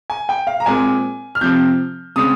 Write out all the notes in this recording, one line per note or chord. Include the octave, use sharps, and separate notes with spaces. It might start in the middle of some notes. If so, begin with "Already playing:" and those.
G#5
G5
F5
A#5
A#2 G#3 C4 G#5
F6
C3 F3 C4 G6
C#3 G#3 C4 D#6